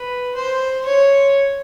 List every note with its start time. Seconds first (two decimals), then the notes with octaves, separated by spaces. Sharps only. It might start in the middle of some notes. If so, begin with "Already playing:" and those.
Already playing: B4
0.35 C5
0.85 C#5